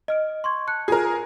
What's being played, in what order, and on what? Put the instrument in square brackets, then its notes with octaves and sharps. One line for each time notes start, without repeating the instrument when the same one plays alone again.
[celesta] D#5 F6 D7
C6 C#6 G#6
A5 F#6 C#7
[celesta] F4 [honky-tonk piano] G#4 A#4